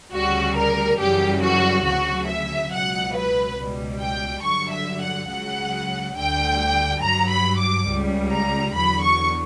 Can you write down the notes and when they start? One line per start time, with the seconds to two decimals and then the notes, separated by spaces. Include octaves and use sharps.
0.13 D2 C#3 G3 F#4
0.56 A#4
0.99 F#2 C#3 E3 G3 G4
1.42 F#4
1.85 D2 C#3 F#3 F#4
2.28 E5
2.71 C#2 B2 F#3 F#5
3.14 B4
3.57 C#2 B2 G3
4.00 G5
4.43 G2 D3 F#3 C#6
4.72 E5
5.01 F#5
5.29 C#2 C#3 F#3 F#5
6.16 D2 D3 G3 G5
7.01 G2 F#3 A#5
7.30 B5
7.59 D6
7.87 C#2 C#3 G3
8.30 A#5
8.74 E2 D3 F#3 B5
9.02 C#6